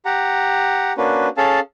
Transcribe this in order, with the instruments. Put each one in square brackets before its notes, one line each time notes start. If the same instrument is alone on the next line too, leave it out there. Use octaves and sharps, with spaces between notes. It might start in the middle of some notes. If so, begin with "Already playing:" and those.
[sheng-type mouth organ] G4 F#5 A#5
A#3 C#4 D4 F#4 B4
C#4 G#4 A4 F5 A5